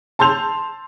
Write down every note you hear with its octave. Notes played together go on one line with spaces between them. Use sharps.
A5 C6 E6 G6 F7